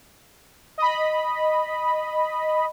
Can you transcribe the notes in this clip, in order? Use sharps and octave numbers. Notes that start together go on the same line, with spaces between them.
D#5 B5